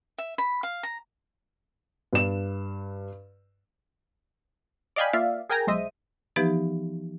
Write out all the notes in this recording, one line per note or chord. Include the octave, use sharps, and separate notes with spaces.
E5
B5
F5
A#5
G2 E7
D5 D#5 F5 G5 G#5 B5
A#3 F4 D5 E5 F5
G#4 A#4 G5 G#5 A#5
B1 G#3 C5 D#5 E5 D#7
E3 F3 B3 D#4 G4 B4